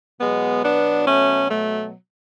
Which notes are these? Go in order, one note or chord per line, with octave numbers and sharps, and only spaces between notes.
B2 F#3 G#3 B3
B3 D4
A3 C#4
A3